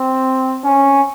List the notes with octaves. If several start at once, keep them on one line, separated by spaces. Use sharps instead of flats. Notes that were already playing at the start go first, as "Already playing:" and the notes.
Already playing: C4
C#4